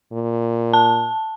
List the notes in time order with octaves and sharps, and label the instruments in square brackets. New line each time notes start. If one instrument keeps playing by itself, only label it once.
[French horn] A#2
[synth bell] A5